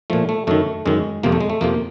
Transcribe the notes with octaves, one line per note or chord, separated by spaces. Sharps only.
A#2 F3 A3
A3
F#2 D#3 A3
F#2 D#3 G#3
F2 C3 F3 A#3
A3
G#3
A3
F2 C3 F3 A#3